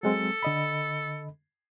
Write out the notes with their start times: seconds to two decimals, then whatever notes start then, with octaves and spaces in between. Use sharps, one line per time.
0.03 F#3 G#3 C4 A4
0.43 D3 D#5 B5